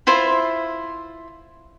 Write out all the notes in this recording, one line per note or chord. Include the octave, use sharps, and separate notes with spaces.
E4 F4 C5 E5